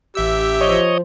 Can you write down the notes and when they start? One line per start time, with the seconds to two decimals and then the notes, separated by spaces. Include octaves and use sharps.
0.15 A1 G4 E5 E6
0.61 F3 C#5 D#5